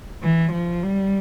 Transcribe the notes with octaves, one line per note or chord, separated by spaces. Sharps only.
E3
F3
G3